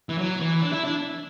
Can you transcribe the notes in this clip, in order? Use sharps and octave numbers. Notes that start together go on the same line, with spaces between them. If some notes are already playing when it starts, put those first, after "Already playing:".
E3
F#3
E3
D4
E4
D4